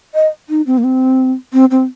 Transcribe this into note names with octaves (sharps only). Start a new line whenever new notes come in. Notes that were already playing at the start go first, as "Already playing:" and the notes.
D#5
D#4
C4
A#3
C4
C4
C4